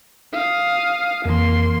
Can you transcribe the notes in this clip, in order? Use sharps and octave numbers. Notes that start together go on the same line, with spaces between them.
F5 D#6
F2 E3 A#3 C6